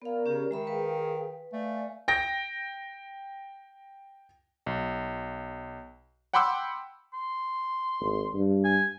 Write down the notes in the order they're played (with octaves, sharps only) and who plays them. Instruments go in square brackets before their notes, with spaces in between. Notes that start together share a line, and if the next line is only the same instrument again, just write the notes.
[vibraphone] B3 F5 [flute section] A#4 C#5 D5
[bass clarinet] C#3 [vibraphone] C#4 G4
[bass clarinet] D#3 [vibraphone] G#3 E5 B5
[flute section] G#4 F5 G5 [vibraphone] B4
[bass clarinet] A3 [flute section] D5 F5 G#5
[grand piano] G5 A#6
[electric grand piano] B1
F#5 G5 B5 C6 D6 E6
[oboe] C6
[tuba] G#1
G2
[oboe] G#5